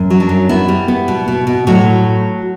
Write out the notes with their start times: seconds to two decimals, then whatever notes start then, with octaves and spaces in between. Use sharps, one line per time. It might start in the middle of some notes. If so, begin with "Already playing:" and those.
Already playing: F#2
0.10 F#3
0.20 D4
0.29 F#2
0.49 B3 E4
0.68 G3
0.88 B3
1.08 B2
1.28 B2
1.47 B2
1.67 A2 F#3 F#4